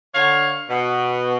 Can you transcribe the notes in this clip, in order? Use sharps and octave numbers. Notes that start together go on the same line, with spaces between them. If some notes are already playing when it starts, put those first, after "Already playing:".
D3 C#5 F5
B2